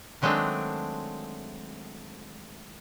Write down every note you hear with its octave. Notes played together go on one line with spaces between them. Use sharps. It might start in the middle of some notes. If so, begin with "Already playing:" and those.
D#3 F#3 G#3 A3 C4 D4